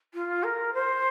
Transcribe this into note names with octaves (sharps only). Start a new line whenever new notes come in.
F4
A#4
C5